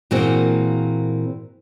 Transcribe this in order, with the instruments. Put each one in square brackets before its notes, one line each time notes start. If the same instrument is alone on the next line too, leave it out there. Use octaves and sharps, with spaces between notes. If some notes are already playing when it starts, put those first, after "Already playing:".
[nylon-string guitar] A#2 E3 A#3 C4 F#4 G#4